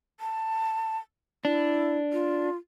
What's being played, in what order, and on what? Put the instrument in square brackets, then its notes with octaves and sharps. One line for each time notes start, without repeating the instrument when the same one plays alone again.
[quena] A5
[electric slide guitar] D4 [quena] E4
[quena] F4